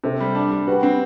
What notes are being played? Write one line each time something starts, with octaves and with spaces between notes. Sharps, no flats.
C3 A4 C5
G3
D4
G3
F#4 G4 B4
C4